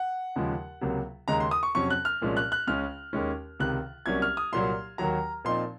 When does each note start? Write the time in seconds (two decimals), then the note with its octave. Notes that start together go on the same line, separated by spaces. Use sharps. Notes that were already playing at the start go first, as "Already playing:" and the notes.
Already playing: F#5
0.36 D#2 C#3 F3 G#3
0.81 C#2 C3 F#3 A#3
1.28 D#2 C#3 G#3 D#4 A#5
1.40 C6
1.51 D#6
1.63 C#6
1.75 F2 C3 F#3 C#4 C#6
1.90 F#6
2.05 F6
2.21 C2 A#2 F3 G#3 C#4
2.37 F#6
2.52 F#6
2.67 C#2 C#3 G#3 C#4 F6
3.13 D#2 D#3 G#3 C#4
3.60 C#2 C3 D#3 F#6
4.06 C2 C3 F#3 A#3 C#4 G#6
4.22 F6
4.37 D#6
4.52 C2 A#2 F#3 A#3 C6
4.98 D#2 D#3 F#3 A#5
5.45 A#2 F3 C4 D#4 C6